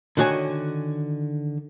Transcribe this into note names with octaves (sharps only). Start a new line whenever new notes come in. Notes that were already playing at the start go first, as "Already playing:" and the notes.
D3 D#3 F#4 C#5 G#5